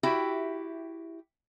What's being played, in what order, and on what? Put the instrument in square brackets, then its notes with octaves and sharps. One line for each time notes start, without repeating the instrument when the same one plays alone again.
[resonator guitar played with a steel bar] E4 F#4 G4 E5